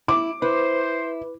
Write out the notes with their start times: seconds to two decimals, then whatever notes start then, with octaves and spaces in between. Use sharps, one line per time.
0.08 E4 D6
0.42 E4 B4 C5